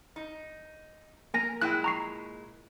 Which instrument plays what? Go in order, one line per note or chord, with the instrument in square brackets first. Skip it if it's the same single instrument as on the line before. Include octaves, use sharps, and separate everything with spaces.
[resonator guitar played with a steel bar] D#4
[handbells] A#3 G#5 A#6 [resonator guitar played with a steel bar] A#4
[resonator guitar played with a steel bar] A#2 G#3 E4 [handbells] G5 F#6
[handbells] A#5 C#6 C7